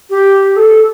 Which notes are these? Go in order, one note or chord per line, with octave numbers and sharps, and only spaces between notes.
G4
A4